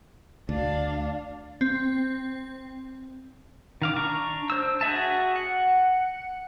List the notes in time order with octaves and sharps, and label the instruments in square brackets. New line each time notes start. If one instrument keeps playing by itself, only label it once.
[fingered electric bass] D2 [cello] D4 F5
[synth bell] C4
[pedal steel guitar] D#3 F5 D6
D4 A#5 C#6
D4 C5 E6
F#4 G#4 E5 A5
F#5